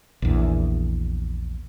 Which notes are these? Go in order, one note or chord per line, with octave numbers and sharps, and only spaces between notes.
A#1 E2